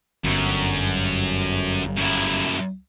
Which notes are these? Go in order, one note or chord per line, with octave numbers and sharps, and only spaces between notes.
G1 F#2
F#2 E4